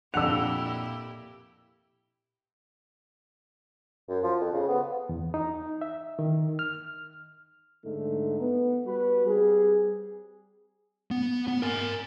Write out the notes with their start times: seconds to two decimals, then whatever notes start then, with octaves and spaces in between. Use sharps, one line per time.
0.14 F2 A#2 D4 E4 G4 F#5 E6 F7
4.09 F#2
4.23 F3
4.41 F2
4.53 C#3
4.68 B3
5.09 E2
5.34 D#4
5.81 E5
6.19 D#3
6.59 F6
7.85 G#2 D3 A3 D#4
8.40 B3
8.85 G3 F#4 B4
9.26 G3 C4 G#4
11.11 B3
11.48 B3
11.62 A#4 G#5